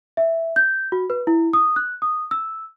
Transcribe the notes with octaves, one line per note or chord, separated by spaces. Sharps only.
E5
G6
F#4
B4
E4
D#6
F#6
D#6
E6